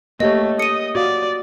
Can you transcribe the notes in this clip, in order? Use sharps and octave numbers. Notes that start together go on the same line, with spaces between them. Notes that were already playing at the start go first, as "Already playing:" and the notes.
A3 A#3 G4 C#5 D#5
D#5 D#6 C#7 D#7
F#4 D5 F5